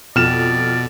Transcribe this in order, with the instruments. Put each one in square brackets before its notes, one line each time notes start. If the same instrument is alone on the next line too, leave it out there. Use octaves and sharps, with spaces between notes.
[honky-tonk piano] F2 [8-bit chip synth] B2 [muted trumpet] D5 [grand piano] F6 E7